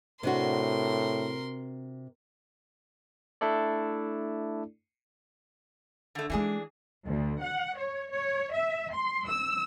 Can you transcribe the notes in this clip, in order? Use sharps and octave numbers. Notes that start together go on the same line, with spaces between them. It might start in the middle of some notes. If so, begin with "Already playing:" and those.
A2 C3 D4 F#4 A#4 C6
A3 D4 E4 A4 D5
D3 A3
E3 G#3 D4 D#4 G#4
D2
F#5
C#5
C#5
E5
C6
E6